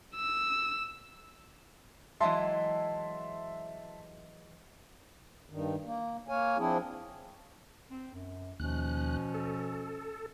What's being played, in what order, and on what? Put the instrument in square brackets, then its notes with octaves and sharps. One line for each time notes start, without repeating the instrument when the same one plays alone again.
[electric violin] E6
[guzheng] E3 F#3 G#3 [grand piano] E5 A5 C6
[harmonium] G2 D#3
A#3
A#3 C#5 F5 G#5
F3 C4 D4 E4 G#4
[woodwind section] C4
F#2
[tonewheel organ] D#2 F#6 [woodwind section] B2 F3 C#4
[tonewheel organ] A4